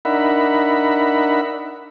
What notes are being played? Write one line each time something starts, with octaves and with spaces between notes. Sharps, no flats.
D4 D#4 A#4 E5 F#5 B5